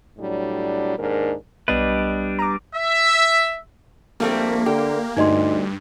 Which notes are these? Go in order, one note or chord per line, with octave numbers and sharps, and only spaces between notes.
A2 F#3 G3 D4
D#2 G#2 D4 A#4
B1 G3 B3 D4 B4 D#5
A#5 D6
E5
A#1 G3 A3 A#3 C4
D3 G4
D2 G2 D#4 D#5 C6